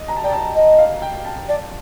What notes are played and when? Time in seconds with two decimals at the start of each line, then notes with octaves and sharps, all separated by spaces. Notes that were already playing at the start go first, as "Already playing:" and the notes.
Already playing: D#5
0.08 A#5
0.16 A5
0.24 D5 G5
0.33 A5
0.55 D#5
0.79 F5
1.02 G5
1.25 A5
1.48 D5 A5